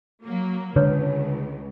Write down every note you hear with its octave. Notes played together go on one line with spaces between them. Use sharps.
F#3 A#3
C#2 D3 B4 C#5 D#6